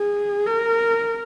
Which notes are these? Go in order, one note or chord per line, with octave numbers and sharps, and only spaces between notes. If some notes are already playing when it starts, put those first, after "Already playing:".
Already playing: G#4
A#4